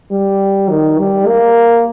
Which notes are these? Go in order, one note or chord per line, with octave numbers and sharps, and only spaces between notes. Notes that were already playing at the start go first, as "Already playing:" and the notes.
G3
D#3
G3
A#3